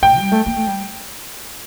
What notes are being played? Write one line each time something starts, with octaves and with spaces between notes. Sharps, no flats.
A2 G5
G3
A3
A#3
A3
G3